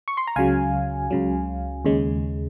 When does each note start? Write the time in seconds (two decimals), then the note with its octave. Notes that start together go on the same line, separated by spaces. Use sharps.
0.08 C#6
0.17 C6
0.27 A#5
0.36 C#2 C#3 F#3 F5 G#5
1.10 C#2 C#3 F#3
1.85 D#2 C#3 G#3